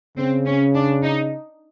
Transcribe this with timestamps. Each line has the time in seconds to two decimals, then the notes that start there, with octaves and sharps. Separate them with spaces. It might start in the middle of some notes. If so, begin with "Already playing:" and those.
0.17 C#3 C4
0.45 C#4
0.74 D4
1.03 D#4